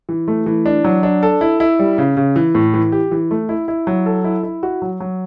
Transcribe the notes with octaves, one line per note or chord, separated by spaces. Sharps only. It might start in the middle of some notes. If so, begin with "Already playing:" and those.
E3
A3
E3
D4
F#3
D4
A4
E4
E4
G3
C#3
C#3
E3
A2
E3
G4
E3
A3
E4
E4
F#3
A4
E4
E4
F#4
F#3
F#3